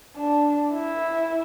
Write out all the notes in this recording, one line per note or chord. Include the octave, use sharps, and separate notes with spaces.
D4
E4